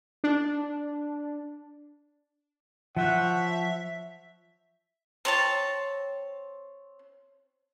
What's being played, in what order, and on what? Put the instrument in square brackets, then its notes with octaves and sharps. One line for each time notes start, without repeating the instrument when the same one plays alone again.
[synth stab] D4
[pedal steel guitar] F3 C5 C#5 [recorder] E5 [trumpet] F#5
[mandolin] C4 C#5 A5